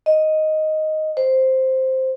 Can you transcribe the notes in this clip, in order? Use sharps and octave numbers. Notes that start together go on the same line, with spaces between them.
D#5
C5